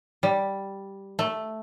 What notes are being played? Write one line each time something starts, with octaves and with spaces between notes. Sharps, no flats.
G3
A3